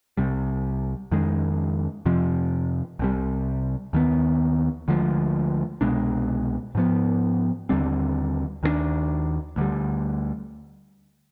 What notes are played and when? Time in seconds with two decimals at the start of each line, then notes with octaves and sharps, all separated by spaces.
0.17 C2 C3 G3
1.12 F2 D#3 G#3
2.06 F2 C3 F3
2.99 C2 C3 G3
3.93 D#2 D#3 B3
4.88 D2 D3 F3 G#3
5.81 C2 B2 G#3 D4
6.75 G#2 F3 B3
7.69 D#2 D3 G3 C4
8.63 D#2 D#3 G#3 D4
9.56 D2 D3 G3